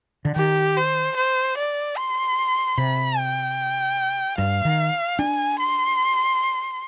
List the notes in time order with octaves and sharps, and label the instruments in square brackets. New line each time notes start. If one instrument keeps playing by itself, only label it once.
[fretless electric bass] D3
[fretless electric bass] D#3 [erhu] G4
[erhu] C5
C5
D5
C6
[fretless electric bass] C3 [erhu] B5
[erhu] G5
[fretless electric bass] G2 [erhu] F5
[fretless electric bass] D#3
[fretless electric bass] D4 [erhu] G#5
[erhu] C6